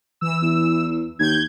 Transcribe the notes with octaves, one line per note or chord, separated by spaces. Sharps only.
E3 E6
E2
D#2 G6 G#6